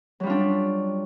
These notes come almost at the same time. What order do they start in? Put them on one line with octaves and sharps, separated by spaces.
F#3 G3 F4 D4